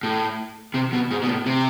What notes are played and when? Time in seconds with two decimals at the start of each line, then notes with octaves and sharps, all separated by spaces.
0.03 A2
0.74 C3
0.93 B2
1.11 G#2
1.22 B2
1.27 A2
1.46 C3